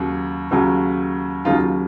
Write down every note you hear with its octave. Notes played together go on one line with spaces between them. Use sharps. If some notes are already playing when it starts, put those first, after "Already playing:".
Already playing: D#2 C#3 F#3
D#2 C#3 F#3
D#2 C#3 F#3 D#4 F4